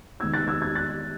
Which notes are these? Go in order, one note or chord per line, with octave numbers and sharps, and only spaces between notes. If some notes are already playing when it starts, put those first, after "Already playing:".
D#3 G#3 B3 D#4 E6 G#6
F#6 A6
E6 G#6
E6 G#6
F#6 A6